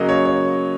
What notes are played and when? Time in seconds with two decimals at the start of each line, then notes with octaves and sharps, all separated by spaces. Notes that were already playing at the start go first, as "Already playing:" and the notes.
Already playing: C#3 F#3 A#3 D#5
0.09 C#5
0.25 C#5